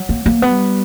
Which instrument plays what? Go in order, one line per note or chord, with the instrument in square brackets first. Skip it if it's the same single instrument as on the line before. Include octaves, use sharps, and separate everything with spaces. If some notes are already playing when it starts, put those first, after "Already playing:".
Already playing: [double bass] F#3
[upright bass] A#3
A#3
[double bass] G3 [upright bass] B3